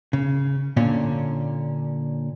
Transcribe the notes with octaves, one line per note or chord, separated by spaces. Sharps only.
C#3
A#2 D3 C#4